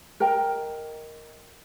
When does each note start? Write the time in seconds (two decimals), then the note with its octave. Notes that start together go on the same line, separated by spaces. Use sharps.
0.20 A#4 D#5 G5 A#5